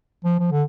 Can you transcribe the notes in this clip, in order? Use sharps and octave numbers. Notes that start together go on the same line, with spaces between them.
F3
F3
D3